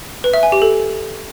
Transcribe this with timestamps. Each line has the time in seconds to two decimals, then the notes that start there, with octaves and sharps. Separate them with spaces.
0.24 B4
0.33 E5
0.43 G#5
0.52 G4
0.62 A4